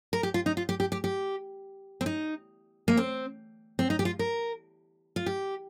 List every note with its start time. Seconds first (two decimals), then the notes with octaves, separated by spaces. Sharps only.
0.13 A#4
0.23 G4
0.34 F4
0.46 D#4
0.57 F4
0.69 G4
0.80 G4
0.92 G4
1.04 G4
2.01 C4
2.06 D#4
2.88 A#3
2.97 C4
3.79 C4
3.90 D#4
3.99 G4
4.05 F4
4.19 A#4
5.16 F4
5.26 G4